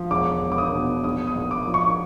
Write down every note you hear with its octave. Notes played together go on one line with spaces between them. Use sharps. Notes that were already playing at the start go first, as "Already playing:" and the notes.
Already playing: F3
E1 D6
E1
D6
D#6
B2
A#1 D#6
D#6
A#1
D6
F3
C#6